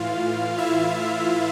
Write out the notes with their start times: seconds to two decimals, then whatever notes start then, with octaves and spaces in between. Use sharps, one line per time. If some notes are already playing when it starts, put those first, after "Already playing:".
Already playing: A2 E3 F4 F5
0.58 E4 E5